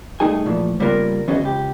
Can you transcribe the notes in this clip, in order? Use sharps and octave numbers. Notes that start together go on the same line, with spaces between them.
C2 G2 A3 D#4 G#4 G#5
A#2 E3 F3 A3
C#3 G3 A#3 B3 F4 A#4
E3 B3 C#4 F#4 G#4 D#5
C#2 G4